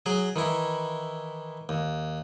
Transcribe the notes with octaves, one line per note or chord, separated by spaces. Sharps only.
F#3 G#4
D#3 E3 E4
D#2